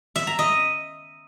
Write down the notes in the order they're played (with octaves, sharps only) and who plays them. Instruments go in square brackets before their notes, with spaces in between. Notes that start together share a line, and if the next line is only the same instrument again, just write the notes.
[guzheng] E5
A#5
D#5